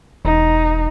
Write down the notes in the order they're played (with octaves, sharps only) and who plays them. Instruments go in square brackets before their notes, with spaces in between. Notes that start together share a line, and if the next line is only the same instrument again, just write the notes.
[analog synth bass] E1 [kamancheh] D#4